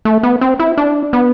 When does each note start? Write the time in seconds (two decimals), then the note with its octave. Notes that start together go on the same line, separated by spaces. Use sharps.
0.05 A3
0.23 B3
0.41 C4
0.59 E4
0.77 D4
1.13 B3